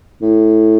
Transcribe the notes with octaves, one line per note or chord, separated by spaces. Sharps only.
A2